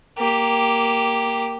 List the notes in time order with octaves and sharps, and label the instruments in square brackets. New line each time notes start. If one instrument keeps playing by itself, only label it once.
[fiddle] A#3 G4